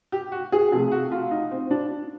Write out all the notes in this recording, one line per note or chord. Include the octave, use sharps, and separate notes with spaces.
G4
F#4
G#4
C3 F3 A3 G#4
F#4
F4
D#4
C4
D4